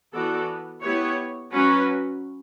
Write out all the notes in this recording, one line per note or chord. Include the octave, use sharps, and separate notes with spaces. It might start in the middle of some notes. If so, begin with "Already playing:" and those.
E3 B3 F#4 A4 D5
B3 E4 G4 C#5
F#3 C#4 F#4 B4